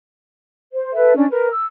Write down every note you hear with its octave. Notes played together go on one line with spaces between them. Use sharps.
C5
A4 B4 E5
C#4 D4 D5
A#4 B4
E6